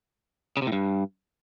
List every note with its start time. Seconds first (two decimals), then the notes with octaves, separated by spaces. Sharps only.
0.57 C#3
0.62 C3
0.67 A2
0.72 G2